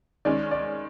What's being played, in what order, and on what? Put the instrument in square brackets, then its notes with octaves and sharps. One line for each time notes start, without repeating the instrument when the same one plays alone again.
[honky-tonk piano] D#3 G#3 C#4 [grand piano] D5
[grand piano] D5